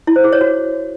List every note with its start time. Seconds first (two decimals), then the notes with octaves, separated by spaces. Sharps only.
0.07 E4
0.16 C5
0.24 G#4
0.33 C#5
0.41 F#4